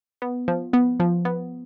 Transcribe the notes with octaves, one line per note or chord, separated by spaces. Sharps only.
B3
F3
B3
F3
B3